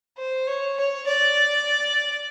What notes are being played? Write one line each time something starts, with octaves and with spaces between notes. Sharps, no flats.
C5
C#5
C#5
D5